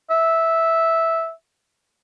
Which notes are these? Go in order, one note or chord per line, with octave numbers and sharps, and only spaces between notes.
E5